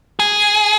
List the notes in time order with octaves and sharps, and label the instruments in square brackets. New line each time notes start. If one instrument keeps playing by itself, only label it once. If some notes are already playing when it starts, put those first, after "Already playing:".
[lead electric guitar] G#4